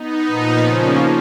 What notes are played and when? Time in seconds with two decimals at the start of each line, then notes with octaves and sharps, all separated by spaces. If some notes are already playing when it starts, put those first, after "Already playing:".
Already playing: B3 D#4
0.27 A#2 F3 B3
0.63 C#3 F3 A#3 C#4